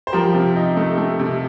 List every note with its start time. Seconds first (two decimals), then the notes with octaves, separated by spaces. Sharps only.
0.07 C5
0.13 F3 G4 A#4
0.34 C3
0.56 D#4
0.77 A3
0.98 A3
1.19 C3